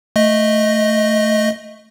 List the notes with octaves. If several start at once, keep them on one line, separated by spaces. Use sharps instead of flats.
A3 D#5